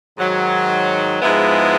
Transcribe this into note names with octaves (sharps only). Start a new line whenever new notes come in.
G#2 D#3 F#3
G#2 F3 G#3 B3 E4